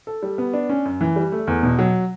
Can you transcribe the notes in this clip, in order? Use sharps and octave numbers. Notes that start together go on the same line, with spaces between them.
A4
G3
B3
D4
C#4
F#2
E3
G3
A3
E2
B2
F#3